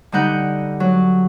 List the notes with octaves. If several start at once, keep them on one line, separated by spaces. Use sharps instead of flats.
D3 G3 D#4 F#5 G6
F#3